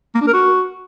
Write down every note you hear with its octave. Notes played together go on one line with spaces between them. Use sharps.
A#3
D4
A#4
F#4